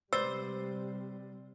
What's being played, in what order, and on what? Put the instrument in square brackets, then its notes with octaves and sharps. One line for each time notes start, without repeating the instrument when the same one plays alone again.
[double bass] C3 G3 [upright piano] B4 D5 A6 [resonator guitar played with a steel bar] C5 [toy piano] E6